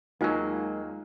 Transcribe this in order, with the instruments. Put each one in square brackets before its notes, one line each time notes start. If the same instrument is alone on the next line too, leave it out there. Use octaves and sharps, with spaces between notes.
[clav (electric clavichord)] D#2 F#3 [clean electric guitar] G#3 A#3 [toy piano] D#4 F4 G#5